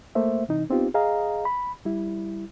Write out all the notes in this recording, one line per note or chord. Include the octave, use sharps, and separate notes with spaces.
A3 A#3 C5 E5
C3 E3 D#4
B3 C4 D#4 F4 G4
G#4 D#5 F5 A#5
B5
G3 E4